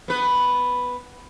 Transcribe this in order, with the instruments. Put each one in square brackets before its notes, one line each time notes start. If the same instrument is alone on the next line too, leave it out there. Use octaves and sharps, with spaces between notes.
[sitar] B3 B4